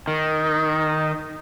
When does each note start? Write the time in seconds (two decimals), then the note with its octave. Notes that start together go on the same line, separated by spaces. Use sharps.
0.08 D#3